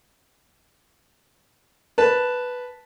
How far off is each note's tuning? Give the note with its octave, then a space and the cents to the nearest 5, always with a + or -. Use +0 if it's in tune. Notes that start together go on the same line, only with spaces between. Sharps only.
B4 +0 A5 +0